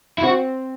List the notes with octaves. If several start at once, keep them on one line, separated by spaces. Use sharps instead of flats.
E4
C4 F#4